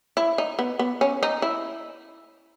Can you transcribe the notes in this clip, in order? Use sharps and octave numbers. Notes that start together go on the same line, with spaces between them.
E4
D#4
B3
B3
C#4
D#4
E4